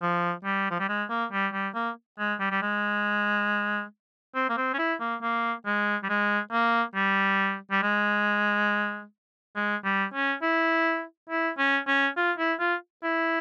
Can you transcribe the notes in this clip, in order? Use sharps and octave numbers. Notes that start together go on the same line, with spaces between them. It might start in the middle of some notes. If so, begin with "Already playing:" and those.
F3
G3
F3
G3
G#3
A#3
G3
G3
A#3
G#3
G3
G3
G#3
C4
A#3
C4
C#4
E4
A#3
A#3
G#3
G3
G#3
A#3
G3
G3
G#3
G#3
G3
C#4
E4
E4
C#4
C#4
F4
E4
F4
E4